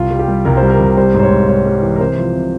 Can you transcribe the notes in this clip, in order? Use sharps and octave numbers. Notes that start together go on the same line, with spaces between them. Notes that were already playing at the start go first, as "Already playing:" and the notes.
Already playing: C2 F4
G3
G4
G3
C2 A#4
C5
G3
A#4
C2
G3 C5
G#2
C5
C#5
G#2
G#2 C#5
G3
E3
A#4
C3 C5
F3
C3